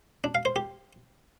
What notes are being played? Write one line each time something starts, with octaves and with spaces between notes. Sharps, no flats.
D4
F5
C5
G4